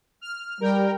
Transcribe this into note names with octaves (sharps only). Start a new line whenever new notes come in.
F6
G3 A#4 G5